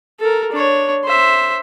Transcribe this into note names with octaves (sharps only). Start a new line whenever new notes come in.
A4 A#4
D4 C#5
C5 E5